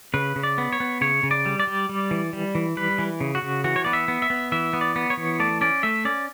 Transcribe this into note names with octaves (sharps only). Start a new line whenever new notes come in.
C#3 B4
C#3
D5
B3
C#5
B3
C#3 C#5
C#3
D5
G3
D5
G3
G3
E3
G3
E3
G3 B4
E3
C#3
F#4
C#3
E3 F#4
C#5
B3 D5
E5
B3
E5
B3
E3 E5
B3
D5
B3
C#5
E3
A3 D5
C#4 D5
A3 E5
C#4 D5